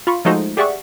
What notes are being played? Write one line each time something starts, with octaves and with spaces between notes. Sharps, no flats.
F4 B5 C#6
F3 G#3 A3 D#4 F#4 C5
G4 G#4 D5 E5 F#5 C#6